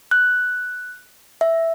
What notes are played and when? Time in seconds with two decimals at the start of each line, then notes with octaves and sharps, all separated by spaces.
0.11 F#6
1.41 E5